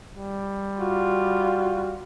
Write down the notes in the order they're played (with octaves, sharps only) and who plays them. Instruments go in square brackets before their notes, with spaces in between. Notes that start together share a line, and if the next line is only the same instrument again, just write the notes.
[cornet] G3
[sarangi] F4 [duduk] F#4